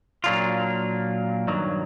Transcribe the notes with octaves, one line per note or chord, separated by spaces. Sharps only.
A#2 F#3 A#3 D4 F4
G2 D#3 F#3